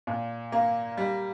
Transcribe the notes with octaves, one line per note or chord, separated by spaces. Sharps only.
A#2
A#3
G3